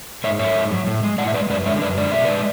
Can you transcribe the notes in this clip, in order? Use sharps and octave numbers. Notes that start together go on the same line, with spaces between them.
G#2 C#5 E5
F#3 C#5 E5
G#2
F#3
A2
G#3
A2 D5 F#5
E5
G#3 B4 D5
F#2 B4 D5
D3 G#3 C#5 E5
F#2 B4 D5
D3 G#3 D5
B2 E5
G#3 B4 D5